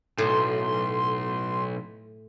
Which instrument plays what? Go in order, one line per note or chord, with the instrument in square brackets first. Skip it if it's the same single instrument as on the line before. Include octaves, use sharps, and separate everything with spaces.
[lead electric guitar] B1 [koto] A2 [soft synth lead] C6